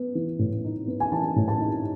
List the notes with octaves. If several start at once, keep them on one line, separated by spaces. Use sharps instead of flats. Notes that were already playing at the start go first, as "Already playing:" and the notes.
Already playing: B3
E3
A2
D#4
B3
G#5
E3 A5
A2
A5
D#4